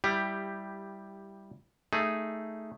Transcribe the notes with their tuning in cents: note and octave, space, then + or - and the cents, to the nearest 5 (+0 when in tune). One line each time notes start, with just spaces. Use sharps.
G3 +0 E4 +0 G4 +10
A3 +0 D#4 +0 G#4 +0